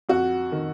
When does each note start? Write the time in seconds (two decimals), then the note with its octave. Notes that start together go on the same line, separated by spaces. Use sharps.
0.09 F2 F#4
0.52 D#3